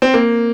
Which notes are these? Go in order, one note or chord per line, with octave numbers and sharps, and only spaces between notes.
C4
A#3